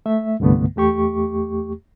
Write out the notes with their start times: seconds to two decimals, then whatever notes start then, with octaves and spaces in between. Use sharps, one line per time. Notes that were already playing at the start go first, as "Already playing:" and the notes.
0.06 A3 E5
0.40 C2 G2 D3 A3 B3
0.76 E2 A3 G4 C#6